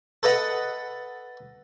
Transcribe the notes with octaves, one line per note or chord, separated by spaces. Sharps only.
A4 B4 D#5 F#5